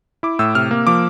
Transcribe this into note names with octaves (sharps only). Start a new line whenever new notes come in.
E4 D6
A2 E6
C3 F6
A#3
F3 D6